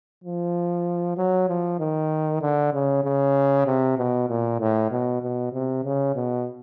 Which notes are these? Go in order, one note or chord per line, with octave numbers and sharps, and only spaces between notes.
F3
F#3
F3
D#3
D3
C#3
C#3
C3
B2
A#2
A2
B2
B2
C3
C#3
B2